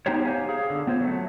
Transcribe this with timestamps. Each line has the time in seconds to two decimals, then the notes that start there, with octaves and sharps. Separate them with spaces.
0.06 B3 D#4 F#4 G4 C5 C#5
0.25 G4 C5 C#5 F5 G#5
0.49 G#4 F5
0.70 D3
0.87 B3 F4 C5 C#5
1.01 F#3 A3